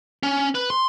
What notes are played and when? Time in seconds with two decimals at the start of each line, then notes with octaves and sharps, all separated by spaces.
0.23 C#4
0.55 B4
0.70 C6